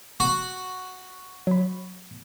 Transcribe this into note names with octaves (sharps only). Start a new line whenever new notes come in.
F#4
F#3 B5